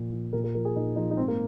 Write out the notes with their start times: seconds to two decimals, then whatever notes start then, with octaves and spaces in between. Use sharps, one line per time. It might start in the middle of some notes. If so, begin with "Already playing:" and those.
Already playing: A#2 F3
0.12 F3
0.33 A#2 A#4
0.44 A#4
0.55 F3 A#4
0.65 G#4
0.76 A#2 D#4
0.96 F3 D#4
1.11 D#4
1.17 G#2 C4
1.28 A#3